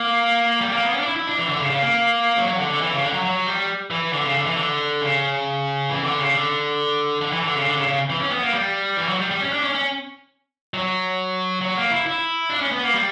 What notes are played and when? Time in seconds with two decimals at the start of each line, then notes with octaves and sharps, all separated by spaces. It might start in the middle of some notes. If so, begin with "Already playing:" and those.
Already playing: A#3
0.61 G3
0.72 A#3
0.83 B3
0.94 C#4
1.00 D4
1.05 E4
1.16 E4
1.27 D4
1.38 E3
1.49 D3
1.60 C#3
1.70 C#3
1.82 A#3
2.37 F#3
2.48 F#3
2.59 D3
2.70 D3
2.81 E3
2.91 C#3
3.03 D3
3.14 F#3
3.25 F#3
3.47 G3
3.91 E3
4.13 D3
4.24 C#3
4.35 D3
4.46 E3
4.57 D3
5.02 C#3
5.89 E3
6.04 D3
6.18 C#3
6.33 D3
7.21 D3
7.32 E3
7.44 D3
7.55 C#3
7.65 D3
7.76 C#3
7.87 C#3
8.10 E3
8.20 C#4
8.32 B3
8.42 A#3
8.54 G3
8.97 E3
9.09 F#3
9.20 G3
9.31 G3
9.41 C#4
9.53 D4
9.64 C#4
9.75 C#4
10.74 F#3
11.61 F#3
11.77 A#3
11.91 E4
12.06 E4
12.50 D4
12.61 C#4
12.72 B3
12.83 A#3
12.94 G3